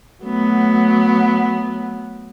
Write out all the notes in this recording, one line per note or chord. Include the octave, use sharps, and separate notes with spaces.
F#3 A3 B3